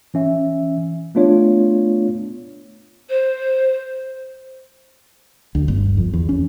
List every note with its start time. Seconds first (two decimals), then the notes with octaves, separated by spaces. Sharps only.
0.14 E3 C#4 E5
1.15 A3 B3 D4 F4 C#5
3.09 C5
5.55 D2
5.68 G1
5.97 F2
6.13 E2
6.29 C#4